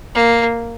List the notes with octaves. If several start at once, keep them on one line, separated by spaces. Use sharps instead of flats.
A#3